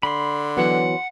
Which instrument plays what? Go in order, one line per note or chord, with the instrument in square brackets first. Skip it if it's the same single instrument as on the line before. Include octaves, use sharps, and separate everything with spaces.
[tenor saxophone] D3 [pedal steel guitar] B5 C6
[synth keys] E3 F#3 B3 [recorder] F#5